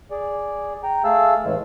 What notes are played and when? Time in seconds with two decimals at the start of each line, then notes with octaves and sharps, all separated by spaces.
0.11 G#4 D5
0.83 G5 A#5
1.04 A3 G#4 F5 A5 E6
1.44 A2 C#3 E3 G#3